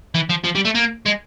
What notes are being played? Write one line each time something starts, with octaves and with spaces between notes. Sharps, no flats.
E3
F3
F3
G3
A3
A#3
G#3